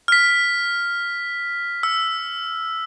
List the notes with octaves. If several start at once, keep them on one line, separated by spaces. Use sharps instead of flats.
F6 B6
E6